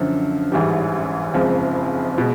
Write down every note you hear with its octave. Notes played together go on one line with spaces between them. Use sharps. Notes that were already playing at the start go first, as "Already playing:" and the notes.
Already playing: F#2 D3 F3
A1 G#2 E3 G3
F#1 F2 C#3 F3 G#3
B2 G#3